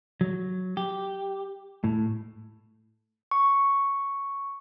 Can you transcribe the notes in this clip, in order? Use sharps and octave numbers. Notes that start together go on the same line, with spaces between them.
F#3
G4
A2
C#6